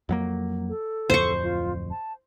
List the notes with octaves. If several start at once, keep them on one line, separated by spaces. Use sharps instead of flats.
F2 F#3 A#3
A4
D1 F2 C5 C#6
F4
A5